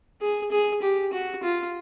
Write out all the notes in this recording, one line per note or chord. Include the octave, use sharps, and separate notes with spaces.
G#4
G#4
G4
F#4
F4